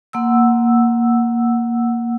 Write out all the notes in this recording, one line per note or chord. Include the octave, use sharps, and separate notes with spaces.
A#3 F#5 E6